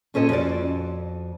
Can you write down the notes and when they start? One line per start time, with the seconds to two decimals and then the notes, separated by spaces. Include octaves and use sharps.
0.14 A#2 C#4 A4 C5 D#5
0.29 F2 F#4 C5 D5